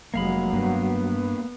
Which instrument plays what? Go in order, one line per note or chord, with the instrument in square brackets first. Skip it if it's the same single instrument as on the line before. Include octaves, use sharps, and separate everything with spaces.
[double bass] F1 G#3 [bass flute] F#3 [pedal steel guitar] A#3 F5 B5
[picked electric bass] G2 [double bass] B3